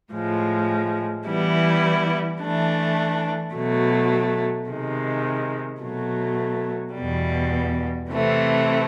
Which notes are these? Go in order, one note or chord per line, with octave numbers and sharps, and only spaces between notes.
A2 F3 G#3
E3 G3 B3 E4
E3 A3 D4
B2 F#3 A3
C3 D#3 G#3
B2 F#3 A3
E2 B2 G3
C3 E3 A3 C4